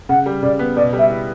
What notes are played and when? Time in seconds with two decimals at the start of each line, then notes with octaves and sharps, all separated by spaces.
0.09 C#3 F#5
0.26 G3
0.43 C#3 D5
0.59 B3
0.76 B2 D5
0.93 G3
0.99 E5
1.10 E4